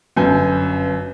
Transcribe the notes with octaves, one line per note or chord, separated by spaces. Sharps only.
G1 F#2 G#5 G6